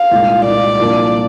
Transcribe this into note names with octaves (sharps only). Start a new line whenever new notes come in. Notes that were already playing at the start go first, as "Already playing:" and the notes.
Already playing: F5
C2 A#2 G#3 D#4
C2 A#2 G#3 D#4 D5
C2 A#2 F3 A#3 D4